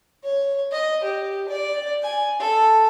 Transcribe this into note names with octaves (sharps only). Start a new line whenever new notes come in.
C#5
D#5
G4
D5
G#5
A4